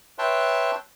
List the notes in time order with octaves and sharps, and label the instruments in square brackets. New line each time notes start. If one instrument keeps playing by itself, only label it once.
[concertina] B4 C#5 E5 G5 A5 C6